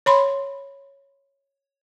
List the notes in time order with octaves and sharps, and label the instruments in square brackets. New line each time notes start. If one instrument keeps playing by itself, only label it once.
[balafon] C#5 B5 C6